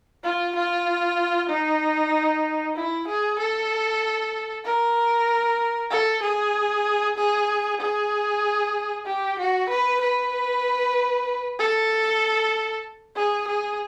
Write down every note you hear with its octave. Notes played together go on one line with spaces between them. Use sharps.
F4
F4
D#4
E4
G#4
A4
A#4
A4
G#4
G#4
G#4
G4
F#4
B4
B4
A4
G#4
G#4